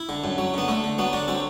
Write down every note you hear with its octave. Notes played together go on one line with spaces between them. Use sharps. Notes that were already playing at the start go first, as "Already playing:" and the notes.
Already playing: E4
D3
F#2
F#3
D3 B3
D3 A3
D3
F#3 B3
D3 D4
F#3 C4